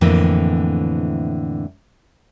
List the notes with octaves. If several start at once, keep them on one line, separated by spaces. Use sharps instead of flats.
F2 A2 D3 E3 A#3 C4